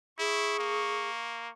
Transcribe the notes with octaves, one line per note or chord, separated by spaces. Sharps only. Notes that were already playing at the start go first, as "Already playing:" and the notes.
E4 G#4 C#6
A#3